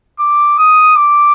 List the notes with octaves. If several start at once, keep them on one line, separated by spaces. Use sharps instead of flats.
D6
D#6
D6